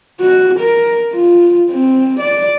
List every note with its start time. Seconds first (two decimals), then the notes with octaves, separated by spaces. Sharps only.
0.20 F#4
0.59 A#4
1.13 F4
1.71 C4
2.20 D5